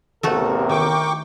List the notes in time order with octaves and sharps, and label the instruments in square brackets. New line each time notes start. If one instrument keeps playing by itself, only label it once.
[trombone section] A1 E2 C3 [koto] A3 F#4 A4 [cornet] A#4
[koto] D#3 [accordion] G5 C#6 D6